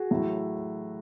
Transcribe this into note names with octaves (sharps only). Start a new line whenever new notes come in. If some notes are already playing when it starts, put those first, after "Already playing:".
Already playing: F#4 G#4
A2 F#3 A3